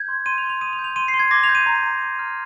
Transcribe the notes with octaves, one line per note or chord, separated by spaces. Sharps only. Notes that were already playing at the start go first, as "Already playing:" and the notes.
Already playing: G6 G#6
C6
C6 D#7
F7
G6
F7
D#6 D#7
F7
G6
F7
C6 D#7
C7
C6
G#6
D6 A#6
F7
G6
D#7
A#5
A#5
C6
F6